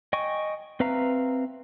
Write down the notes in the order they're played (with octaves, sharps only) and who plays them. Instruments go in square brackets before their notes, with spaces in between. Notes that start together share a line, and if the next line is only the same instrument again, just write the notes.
[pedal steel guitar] D#5 G5 G#5 C#6
C4 B4 E5 F5 A#5